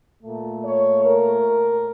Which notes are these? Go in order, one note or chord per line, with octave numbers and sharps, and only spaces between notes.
A#2 A3
C#5
A#4